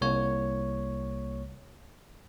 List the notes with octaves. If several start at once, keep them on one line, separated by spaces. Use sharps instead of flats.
C2 A#3 C#5